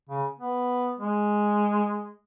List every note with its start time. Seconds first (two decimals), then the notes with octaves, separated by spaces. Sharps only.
0.09 C#3
0.39 B3
0.99 G#3